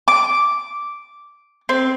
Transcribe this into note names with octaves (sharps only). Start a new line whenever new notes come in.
D6
C4